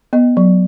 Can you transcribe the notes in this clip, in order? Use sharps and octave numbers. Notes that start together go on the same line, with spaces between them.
B3 D#5
F#3